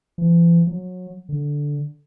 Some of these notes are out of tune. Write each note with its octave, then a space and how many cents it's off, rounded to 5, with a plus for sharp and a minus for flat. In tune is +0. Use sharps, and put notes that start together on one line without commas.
E3 +45
F#3 -25
D3 -5